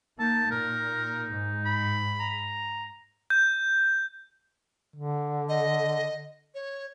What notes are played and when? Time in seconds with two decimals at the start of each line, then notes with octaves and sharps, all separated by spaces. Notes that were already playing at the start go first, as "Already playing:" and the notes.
0.19 A#3 D#4 A5
0.51 A#2 A#4
1.32 G#2
1.65 B5
2.20 A#5
3.30 G6
4.96 D3
5.49 D#5
6.55 C#5